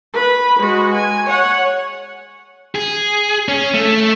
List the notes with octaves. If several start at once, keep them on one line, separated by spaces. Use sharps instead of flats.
B4 B5
G#3 F#4
G#5
C#5 F#5
G#4
C#4
A3